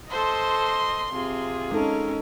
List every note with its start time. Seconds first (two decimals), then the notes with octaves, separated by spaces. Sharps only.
0.11 A4 C5 D#5 C6
1.12 C3 F4 G#4
1.72 G#3 C#4 D#4 A4 A#4